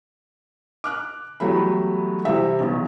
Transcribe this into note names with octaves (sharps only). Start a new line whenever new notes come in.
D6 F6 F#6
E2 F#3 G3 A3 B5
C3 E3 G3 E5
B1 E2